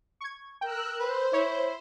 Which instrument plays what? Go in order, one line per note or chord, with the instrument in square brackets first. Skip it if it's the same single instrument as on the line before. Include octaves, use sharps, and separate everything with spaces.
[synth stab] C#6 G#6
[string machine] A#4 E6 F#6 [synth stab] G5
[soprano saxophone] B4 [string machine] C5
[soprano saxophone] E4 [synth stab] C#5